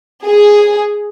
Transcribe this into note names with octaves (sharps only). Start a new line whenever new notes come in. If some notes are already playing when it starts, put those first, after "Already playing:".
G#4